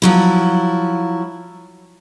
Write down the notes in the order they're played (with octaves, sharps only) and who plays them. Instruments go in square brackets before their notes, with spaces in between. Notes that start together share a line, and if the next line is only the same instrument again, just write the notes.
[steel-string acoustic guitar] F3 F#3 E4